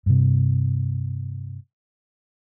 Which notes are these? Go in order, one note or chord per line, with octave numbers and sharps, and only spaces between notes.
G2 C3